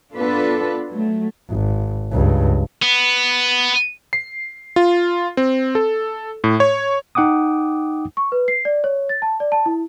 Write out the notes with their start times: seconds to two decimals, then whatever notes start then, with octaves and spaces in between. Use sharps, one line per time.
0.14 B3 D4 F4 A4 B4
0.90 F#3 A3
1.50 G#1
2.12 C#2 G2
2.83 B3
4.13 C7
4.76 F4
5.37 C4
5.75 A4
6.44 A2
6.60 C#5
7.15 D#4 F#5 G5 D6 D#6
8.17 C#6
8.32 B4
8.48 C7
8.65 D5
8.84 C#5
9.09 A6
9.22 A5
9.40 D5
9.52 A5
9.66 E4